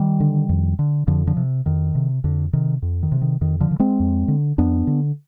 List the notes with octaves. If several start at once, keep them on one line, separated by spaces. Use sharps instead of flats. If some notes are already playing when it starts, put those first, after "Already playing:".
Already playing: D#3 G3
D3
F2
D3
F2 D3 F3
D3 F3
C3
F2 D#3
C3
F2 D3
C3 D#3
F2
D#3
C3
D#3
F2 D#3
D3 F3
D3
G#3 C4
F2
D3
F2 B3 D4
D3